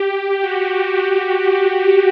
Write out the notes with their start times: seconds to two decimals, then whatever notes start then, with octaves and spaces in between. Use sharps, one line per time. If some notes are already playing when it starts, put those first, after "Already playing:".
Already playing: G4
0.41 F#4